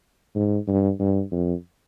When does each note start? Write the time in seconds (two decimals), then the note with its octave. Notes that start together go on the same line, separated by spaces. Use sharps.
0.36 G#2
0.68 G2
1.00 G2
1.32 F2